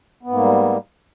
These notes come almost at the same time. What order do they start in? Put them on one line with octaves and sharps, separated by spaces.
B3 G#2 A#3 G3